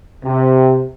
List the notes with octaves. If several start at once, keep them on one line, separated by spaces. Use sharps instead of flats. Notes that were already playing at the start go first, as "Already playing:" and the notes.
C3